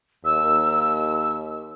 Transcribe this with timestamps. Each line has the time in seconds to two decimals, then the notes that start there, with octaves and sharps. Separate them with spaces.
0.25 D#2 E6